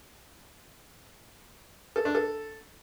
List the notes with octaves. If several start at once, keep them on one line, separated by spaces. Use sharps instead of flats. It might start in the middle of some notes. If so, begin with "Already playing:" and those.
A4
D4
A4